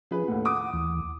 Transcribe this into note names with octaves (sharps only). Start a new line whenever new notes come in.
F3 C#4 F4 G#4 B4
D#2 A2 F#5
D6 D#6
D#2 E3